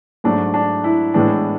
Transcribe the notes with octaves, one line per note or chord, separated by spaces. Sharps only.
G#2 F#3 A3 D4
D4
E4
A2 E3 G#3 B3 D4